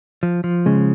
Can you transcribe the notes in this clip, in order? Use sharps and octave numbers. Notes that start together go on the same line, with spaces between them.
F3
F3
C#3 G#3